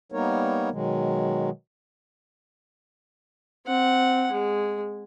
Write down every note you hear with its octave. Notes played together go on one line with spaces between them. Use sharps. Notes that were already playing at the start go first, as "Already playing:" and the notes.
G3 A#3 B3 D#4 A#4 C#5
B2 D#3 F#3 G#3
C4 F#5
G#3